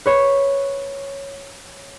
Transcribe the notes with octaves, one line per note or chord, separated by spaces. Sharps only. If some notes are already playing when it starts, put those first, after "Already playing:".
B4 C#5 B5